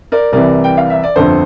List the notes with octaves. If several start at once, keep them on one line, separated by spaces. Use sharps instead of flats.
A#4 D5
C2 C3 E3 A#4 D5
G5
F5
E5
D5
G1 F2 D3 A4 C5